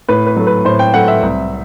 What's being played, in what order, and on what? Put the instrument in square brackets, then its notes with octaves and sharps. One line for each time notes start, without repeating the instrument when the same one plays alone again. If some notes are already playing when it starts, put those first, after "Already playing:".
[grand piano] A2 B4
B4
F#3 A3
B4
A2 C5
G5
F#3 A3 F#5
E5
C2